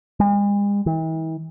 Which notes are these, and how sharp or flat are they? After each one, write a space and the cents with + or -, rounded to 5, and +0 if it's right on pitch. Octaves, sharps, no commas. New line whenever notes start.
G#3 -45
E3 -45